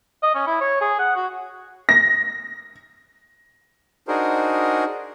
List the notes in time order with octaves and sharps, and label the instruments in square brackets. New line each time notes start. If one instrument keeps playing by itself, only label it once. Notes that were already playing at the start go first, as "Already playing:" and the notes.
[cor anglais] D#5
C#4
E4
C#5
G#4
F#5
F#4
[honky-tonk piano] A#6
[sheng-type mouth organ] D4 D#4 F#4 G#4 A#4 C5